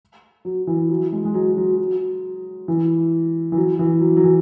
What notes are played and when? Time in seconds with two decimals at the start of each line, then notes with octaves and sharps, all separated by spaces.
0.45 F#3
0.67 E3
0.90 F#3
1.13 G#3
1.25 G#3
1.34 F#3
1.57 F#3
1.78 F#3
2.68 E3
3.52 E3
3.57 F#3
3.79 E3
4.01 F#3
4.17 F#3
4.24 E3